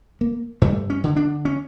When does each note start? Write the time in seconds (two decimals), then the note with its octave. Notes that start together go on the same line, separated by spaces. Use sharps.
0.21 A#3
0.62 G2 A3
0.90 C#4
1.04 D3
1.16 D4
1.45 C#4